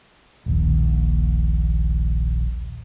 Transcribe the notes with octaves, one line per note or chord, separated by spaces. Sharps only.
D#1 A#1 D#2